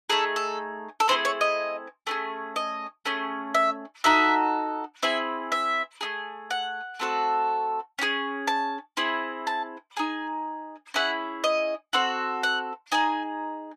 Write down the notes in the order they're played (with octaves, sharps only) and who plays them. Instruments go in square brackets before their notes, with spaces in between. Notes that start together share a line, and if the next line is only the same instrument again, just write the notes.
[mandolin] A3 D#4 G#4 A4
A4
A4
A3 C4 E4 G#4 C5
C#5
D#5
A3 C#4 G#4
D#5
A3 C#4 G#4
E5
D#4 F#4 A4 E5
C4 E4 G#4 E5
E5
A3 D#4 G#4
F#5
A3 C4 F#4 A4
C#4 E4 G#4
A5
C4 E4 G#4
A5
D#4 G#4 G#5
C#4 E4 G#4 F#5
D#5
C4 F#4 A4
F#5
D#4 G#4 G#5